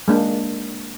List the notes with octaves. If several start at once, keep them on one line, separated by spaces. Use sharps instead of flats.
G#3 A#3 D4